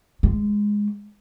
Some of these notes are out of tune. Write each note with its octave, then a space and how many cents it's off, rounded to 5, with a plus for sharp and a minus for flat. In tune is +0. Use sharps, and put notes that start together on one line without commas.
G#3 -5